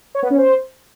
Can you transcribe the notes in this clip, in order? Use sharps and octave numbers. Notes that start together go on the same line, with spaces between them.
C#5
B3
C#4
C5